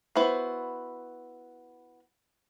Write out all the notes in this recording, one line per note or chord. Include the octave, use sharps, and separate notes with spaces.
B3 E4 F#4 C5